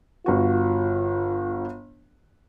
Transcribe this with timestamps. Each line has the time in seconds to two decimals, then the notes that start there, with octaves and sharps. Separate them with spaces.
0.26 G1 F4 F#4